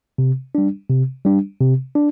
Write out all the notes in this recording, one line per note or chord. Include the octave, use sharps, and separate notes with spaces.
C3
G3 D4
C3
G3 D4
C3
D4